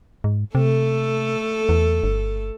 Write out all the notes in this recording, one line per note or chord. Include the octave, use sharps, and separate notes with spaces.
G#2
C3 A3 A4
E2
G1